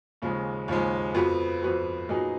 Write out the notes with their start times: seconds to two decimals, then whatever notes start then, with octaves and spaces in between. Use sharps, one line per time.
0.22 D#2 C#3 F3 G#3
0.68 D#2 C#3 F3 G#3
1.14 F2 F3 B3 F#4 B4
1.62 F2 F3 B3 F#4 B4
2.09 A#2 F#3 B3 D#4 G#4